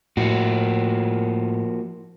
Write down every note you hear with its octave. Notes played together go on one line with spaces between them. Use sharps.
A2 F3 A#3 F#4